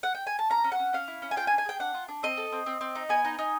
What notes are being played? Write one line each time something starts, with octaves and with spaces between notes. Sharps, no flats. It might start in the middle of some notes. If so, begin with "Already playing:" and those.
F#5
G5
G#5
A5
C#4 A#5
C#4
F#5
C#4
C#4 F5
E4
C#4
G#5
F4 G5
G#5
D4
G#5
G#4 G5
D4 F#5
F4
D4
C4 D#5
A4
C4
C4
C4
D#4
B3 G#5
D#4
D#4